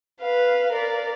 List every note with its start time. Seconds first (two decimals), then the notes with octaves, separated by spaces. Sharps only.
0.21 B4 F5
0.73 A#4 D5